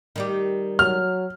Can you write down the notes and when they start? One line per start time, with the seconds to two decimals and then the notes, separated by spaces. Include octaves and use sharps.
0.16 D#3 G3 G4
0.79 F#3 F6